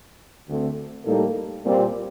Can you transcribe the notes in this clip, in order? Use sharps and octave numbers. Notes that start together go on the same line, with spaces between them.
D2 D3 A3 C4
A2 G3 A#3 D#4 A4
A#2 G3 C4